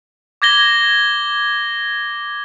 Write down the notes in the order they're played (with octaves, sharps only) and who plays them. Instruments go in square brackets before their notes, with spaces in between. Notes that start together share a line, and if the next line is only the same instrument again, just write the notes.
[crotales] D6 G#6 A#6 G7